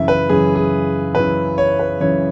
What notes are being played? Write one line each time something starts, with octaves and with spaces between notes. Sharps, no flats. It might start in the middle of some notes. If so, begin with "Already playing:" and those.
Already playing: F#2 C#3 E3 E5
B4
F#2 C#3 E3 G#4
G#4
F#2 C#3 E3 B4
C#5
B4
F#2 C#3 E3 C#5